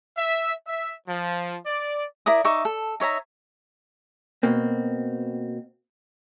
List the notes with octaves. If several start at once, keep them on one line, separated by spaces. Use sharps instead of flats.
E5
E5
F3
D5
E4 A#4 D5 D#6
D#4 E5 C#6 D6
A4
D#4 C#5 E5 A#5
B2 A#3 C4